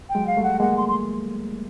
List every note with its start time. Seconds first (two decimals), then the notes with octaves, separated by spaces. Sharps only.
0.09 G5
0.15 F#3 G#3
0.27 F5
0.37 G3 A3
0.43 F#5
0.60 G#3 A#3 F#5
0.77 C6
0.88 C6